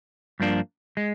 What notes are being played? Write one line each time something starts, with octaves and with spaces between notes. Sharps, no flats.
G2 F3 A#3 D4
G#3